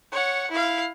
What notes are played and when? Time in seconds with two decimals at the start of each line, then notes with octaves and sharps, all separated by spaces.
0.12 C#5 F#5
0.51 E4 F5